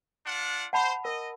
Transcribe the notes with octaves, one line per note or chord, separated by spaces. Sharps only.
D4 F4 F#5
C5 F#5 A5 B5
A#4 D#5